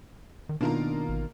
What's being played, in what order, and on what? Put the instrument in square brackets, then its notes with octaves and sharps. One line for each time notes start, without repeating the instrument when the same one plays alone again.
[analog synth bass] D#3
[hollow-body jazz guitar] B2 D#3 [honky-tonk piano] A#3 F4 A#4 [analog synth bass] D4
[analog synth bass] A1